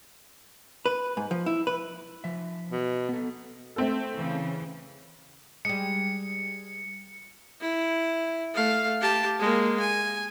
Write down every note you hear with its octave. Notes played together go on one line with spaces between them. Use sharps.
B4
G#2
F3
E4
B4
F3 E5
B2
B3 A4
A3 C4 A4
C#3 E3
G3 G#3 C#7
E4
A3 F5
G4 A5
G#3 A#3
G#5